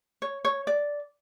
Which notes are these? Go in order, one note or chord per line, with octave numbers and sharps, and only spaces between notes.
C#5
C#5
D5